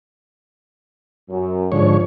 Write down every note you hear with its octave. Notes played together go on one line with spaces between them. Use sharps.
F#2
G#2 D3 F3 C#5